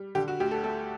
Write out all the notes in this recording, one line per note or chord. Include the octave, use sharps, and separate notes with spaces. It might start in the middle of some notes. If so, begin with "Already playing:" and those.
Already playing: G3
D3 G4
F#4
D2 G4
A4
A3 A4